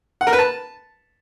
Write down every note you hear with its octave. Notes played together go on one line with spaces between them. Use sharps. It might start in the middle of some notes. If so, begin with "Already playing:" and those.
F#5
A#4
B4
A5